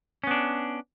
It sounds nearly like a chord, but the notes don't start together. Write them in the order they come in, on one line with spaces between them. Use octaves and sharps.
C#4 B3 D4